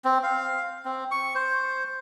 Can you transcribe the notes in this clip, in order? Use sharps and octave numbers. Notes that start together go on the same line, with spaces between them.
C4
F5
C4
C#6
C5